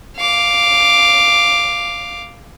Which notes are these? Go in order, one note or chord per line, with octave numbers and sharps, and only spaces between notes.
F5 D6